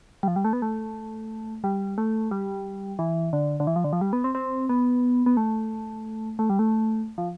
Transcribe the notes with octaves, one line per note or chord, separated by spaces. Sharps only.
G3
F3
G3
A3
B3
A3
G3
A3
G3
E3
D3
D3
E3
F3
D3
F3
G3
B3
C4
C4
B3
B3
A3
A3
G3
A3
F3